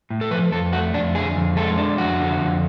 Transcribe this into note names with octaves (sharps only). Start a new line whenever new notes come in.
A2
A4
F3 B4
F2 A4
A3 F#4
F2 D4
D3 G#4
F2
G#3 A4
D4
F2 F#4
D3
F2